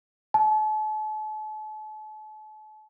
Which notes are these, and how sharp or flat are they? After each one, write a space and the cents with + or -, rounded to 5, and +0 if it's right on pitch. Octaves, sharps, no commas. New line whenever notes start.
A5 -40